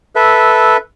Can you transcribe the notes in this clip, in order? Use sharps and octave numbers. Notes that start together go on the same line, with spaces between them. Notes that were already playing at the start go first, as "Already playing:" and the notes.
A4 B4 E5